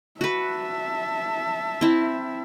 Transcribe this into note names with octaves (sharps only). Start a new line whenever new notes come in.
F#4 B4 E5 A5
C4 E4